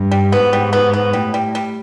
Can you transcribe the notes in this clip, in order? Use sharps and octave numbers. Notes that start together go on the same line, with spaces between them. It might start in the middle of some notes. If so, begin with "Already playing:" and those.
Already playing: G2
G3
G#2 B3
G3
B3
B3
A2 G3
G3
G3